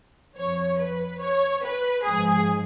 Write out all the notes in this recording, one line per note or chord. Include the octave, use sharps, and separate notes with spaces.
F2 F3 C#5
B4
C#5
B4
G#2 F3 G#4